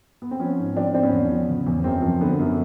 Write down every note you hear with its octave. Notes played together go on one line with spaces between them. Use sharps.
B3
C4
F3 B3 C#4
G#2
F3 C4 D4
G#2 C4 D4
B3 C#4
E2
F3
C#3
E2
F#2 C4
F3
D3 B3
F#2